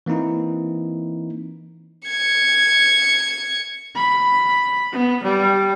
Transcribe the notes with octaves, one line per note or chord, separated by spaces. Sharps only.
E3 A#3 C4 D#4 E4
G#6 C#7
B5
B3
G3